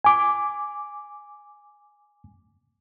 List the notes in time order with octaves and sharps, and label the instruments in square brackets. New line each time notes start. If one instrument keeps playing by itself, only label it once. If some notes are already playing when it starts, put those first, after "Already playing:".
[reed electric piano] G#5 D6